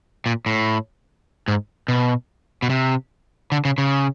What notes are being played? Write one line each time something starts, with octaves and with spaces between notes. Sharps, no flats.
A#2
A2
G#2
B2
B2
C3
D3
C#3
C#3